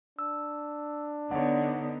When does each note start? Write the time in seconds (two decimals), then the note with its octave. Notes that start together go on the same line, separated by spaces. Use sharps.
0.19 D4 E6
1.31 D3 B3 D#4 C#5 D5 F#5